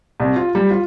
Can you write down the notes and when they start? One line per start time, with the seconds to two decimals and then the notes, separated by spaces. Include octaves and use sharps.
0.20 C2
0.36 F4
0.55 G3
0.70 F4